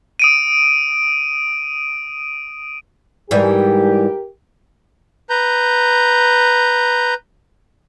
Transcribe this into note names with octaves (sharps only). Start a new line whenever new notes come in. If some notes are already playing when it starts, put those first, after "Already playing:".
D#6 D7 D#7
G#2 E3 G3 G4 A#4
B4 A#5 G6